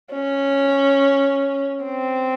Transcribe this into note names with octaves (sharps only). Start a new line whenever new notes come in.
C#4
C4